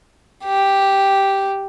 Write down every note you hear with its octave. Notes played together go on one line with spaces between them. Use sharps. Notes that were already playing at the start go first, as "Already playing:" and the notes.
G4